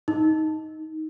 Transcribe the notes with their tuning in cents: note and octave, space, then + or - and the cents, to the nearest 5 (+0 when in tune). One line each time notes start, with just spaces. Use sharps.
D#4 +10